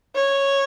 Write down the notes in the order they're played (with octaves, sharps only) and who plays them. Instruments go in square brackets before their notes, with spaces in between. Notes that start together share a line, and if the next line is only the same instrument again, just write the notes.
[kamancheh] C#5